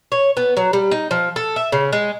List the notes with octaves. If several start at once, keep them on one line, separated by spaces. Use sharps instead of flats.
C#5
B3
F#3
G3
D#4
F3
A4
E5
C#3
G#3